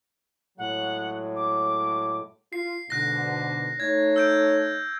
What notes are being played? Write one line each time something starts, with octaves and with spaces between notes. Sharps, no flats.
A2 F#3 G#3 F#5
D6
F4 C7
G#2 B2 D3 F#6 A#6
A3 D#4 C#5 G#6
E6 G6 D7